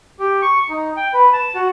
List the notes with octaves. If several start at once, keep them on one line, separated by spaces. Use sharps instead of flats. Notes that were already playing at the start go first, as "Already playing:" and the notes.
G4
C#6
D#4
G5
B4
A5
F#4